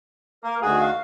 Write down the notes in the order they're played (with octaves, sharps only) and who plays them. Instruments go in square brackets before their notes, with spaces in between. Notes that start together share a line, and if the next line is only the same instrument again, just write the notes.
[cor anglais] A#3 [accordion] A#4
[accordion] D2 D#3 F#4 [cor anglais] G#4
[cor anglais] F5